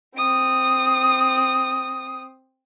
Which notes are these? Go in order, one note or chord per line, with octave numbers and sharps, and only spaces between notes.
C4 D#6